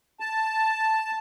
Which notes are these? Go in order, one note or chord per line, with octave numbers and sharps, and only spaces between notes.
A5